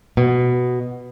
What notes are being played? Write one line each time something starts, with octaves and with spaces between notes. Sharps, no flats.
B2